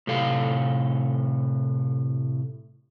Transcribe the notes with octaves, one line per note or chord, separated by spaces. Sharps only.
A2 C3 A4 F5